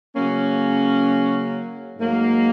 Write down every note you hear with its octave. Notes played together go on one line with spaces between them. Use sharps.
C#3 F#3 A#3 C#4
G#2 F#3 A#3